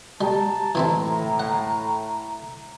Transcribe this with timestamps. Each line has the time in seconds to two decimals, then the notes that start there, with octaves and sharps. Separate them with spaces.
0.21 G3 A5 A#5
0.75 A2 E3 C4 E4
1.40 F#5